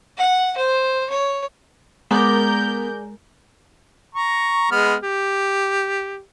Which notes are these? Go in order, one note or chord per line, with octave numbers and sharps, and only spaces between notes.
F#5
C5
C#5
G#3 B3 A#4 D5 A#5 G6
A#5 C#6
G#3 B3 F6
G4